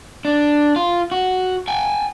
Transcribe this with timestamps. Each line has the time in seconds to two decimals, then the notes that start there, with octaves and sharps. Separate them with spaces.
0.25 D4
0.76 F4
1.11 F#4
1.68 G5 G#5